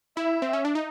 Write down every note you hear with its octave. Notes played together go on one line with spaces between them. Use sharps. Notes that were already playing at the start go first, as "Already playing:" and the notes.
E4 E5
C4
C#4
D4
D#4